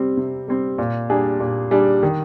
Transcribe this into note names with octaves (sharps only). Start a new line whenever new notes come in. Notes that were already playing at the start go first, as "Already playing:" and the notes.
Already playing: C3 G3 C4
C3
G3 C4
A#2
G3 D4 G#4
A#2
G3 D4 G#4
D#3